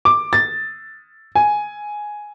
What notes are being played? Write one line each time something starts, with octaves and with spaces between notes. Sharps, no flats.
D6
A6
G#5